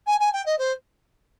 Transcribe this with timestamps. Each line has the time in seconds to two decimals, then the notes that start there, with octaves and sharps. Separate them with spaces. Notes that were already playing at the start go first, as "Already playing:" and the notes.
0.06 G#5
0.19 G#5
0.33 G5
0.45 D#5
0.58 C5